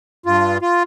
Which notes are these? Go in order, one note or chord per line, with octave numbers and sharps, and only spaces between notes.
G2 F4
F4